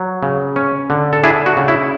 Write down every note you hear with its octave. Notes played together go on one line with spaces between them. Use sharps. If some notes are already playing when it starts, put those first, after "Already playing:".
Already playing: F#3
C#3
C#4
D3
A4
D4 E4 G#4
F#4
C#3
E4